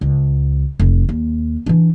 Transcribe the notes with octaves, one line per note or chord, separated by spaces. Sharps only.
C#2
F1
D#2
E3 D4